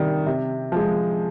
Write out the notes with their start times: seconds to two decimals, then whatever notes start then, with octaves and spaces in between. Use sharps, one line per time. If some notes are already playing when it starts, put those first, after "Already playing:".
Already playing: C3 D#3 G3
0.26 C3
0.72 F3 G#3